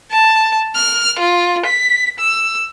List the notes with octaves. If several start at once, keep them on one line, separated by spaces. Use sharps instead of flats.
A5
F6
F4
B6
E6